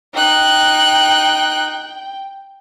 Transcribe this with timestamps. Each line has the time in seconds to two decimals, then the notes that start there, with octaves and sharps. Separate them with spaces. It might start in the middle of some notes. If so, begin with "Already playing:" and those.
0.14 D#4 G5 F#6